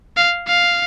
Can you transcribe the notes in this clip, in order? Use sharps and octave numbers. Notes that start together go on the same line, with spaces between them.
F5
F5